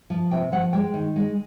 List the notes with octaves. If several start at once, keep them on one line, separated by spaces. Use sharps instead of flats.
F3
C3 G5
F3 F#5
G#3 G5
D#3
G#3